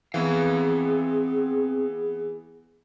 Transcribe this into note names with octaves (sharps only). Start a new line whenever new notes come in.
E3 B3 C4 G#4 F5